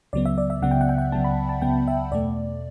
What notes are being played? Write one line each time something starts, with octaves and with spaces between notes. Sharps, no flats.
C#2 C#3 F#3 B3 D5
E5
D5
E5
C#2 C#3 F#3 B3 F#5
G5
F#5
G5
F#5
C#2 C#3 F#3 B3 A5
B5
A5
C#2 C#3 F#3 B3 G5
E5
E2 B2 A3 D5